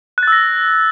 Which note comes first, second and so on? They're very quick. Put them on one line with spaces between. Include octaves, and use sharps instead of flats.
F#6 A6 E6 A#6